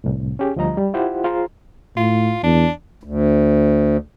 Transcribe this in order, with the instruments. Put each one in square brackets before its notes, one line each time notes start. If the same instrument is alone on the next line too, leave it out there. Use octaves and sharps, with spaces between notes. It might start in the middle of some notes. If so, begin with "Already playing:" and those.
[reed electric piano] C2 A2
C#4 G4 G#4
D2 F3 G3 D#5 A#5
G3
E4 F4 G4 C5 F#5
F4 G#4 C5 A#5 C6
[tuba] A2 [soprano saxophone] F4
[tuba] E2 [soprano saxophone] D4
[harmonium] D2